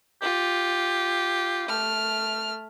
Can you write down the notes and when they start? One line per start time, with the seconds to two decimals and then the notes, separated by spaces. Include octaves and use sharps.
0.22 F4 G4
1.68 A3 F6